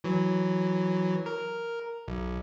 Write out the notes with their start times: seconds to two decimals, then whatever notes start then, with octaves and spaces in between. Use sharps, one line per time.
0.04 E3 F#3
1.26 A#4
2.08 B1